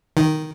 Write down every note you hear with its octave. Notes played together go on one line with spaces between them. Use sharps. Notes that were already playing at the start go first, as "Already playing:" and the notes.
D#3